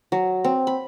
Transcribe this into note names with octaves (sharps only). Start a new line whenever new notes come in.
F#3
C4
B5